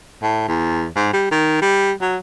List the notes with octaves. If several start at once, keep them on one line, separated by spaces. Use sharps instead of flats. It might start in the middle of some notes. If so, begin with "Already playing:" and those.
A2
E2
G#2
G3
D#3
G3
F#3